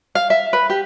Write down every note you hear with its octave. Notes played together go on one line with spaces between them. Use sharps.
F5
E5
B4
G4